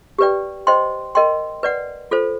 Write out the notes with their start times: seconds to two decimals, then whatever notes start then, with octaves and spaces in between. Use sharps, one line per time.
0.19 G4 B4 D5 G5
0.67 C5 D#5 G5 C6
1.15 A#4 D#5 G5 C6
1.63 B4 D5 F#5
2.11 F4 A4 C5